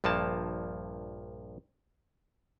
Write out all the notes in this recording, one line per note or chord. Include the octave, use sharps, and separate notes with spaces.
A#1 G2 F3 A#3 A5